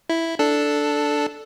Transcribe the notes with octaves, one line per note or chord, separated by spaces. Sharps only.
E4
D4 A4